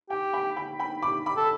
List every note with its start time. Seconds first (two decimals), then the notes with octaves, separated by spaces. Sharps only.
0.10 G4 G5
0.33 G5 B5
0.56 G5 B5
0.79 G5 B5
1.02 B5 D6
1.26 B5 D6
1.37 A4